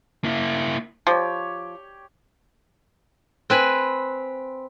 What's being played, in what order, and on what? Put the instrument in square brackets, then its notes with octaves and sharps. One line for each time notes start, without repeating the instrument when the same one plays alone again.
[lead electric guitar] A#3 E4
[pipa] F3 [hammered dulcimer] G4 C#5
[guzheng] C4 B4 G#5 B5